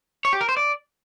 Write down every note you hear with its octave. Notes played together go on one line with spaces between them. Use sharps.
C#5
G4
A#4
C5
D5